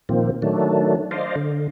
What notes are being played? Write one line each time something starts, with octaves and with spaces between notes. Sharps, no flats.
A#2 D#3 F3 A#3 C4
D#3 F#3 A3 D4
C5 D5 D#5 F5
D3